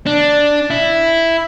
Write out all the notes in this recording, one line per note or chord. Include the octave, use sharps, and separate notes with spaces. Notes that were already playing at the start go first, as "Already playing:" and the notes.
D4
E4